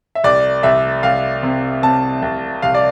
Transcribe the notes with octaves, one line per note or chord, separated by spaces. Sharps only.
E5
C2 D5
C2 E5
C2 F5
C3
C3 A5
C2
C2 F5
D5